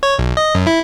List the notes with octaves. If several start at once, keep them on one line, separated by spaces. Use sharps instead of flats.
C#5
B1
D#5
F#2
E4